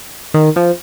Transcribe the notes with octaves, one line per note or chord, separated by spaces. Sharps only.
D#3
F3